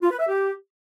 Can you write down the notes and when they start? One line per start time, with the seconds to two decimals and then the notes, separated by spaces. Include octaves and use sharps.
0.02 F4
0.11 B4
0.19 E5
0.28 G4